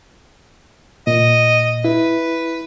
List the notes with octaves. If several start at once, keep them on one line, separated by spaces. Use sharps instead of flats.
A#2 D#5
E4 B4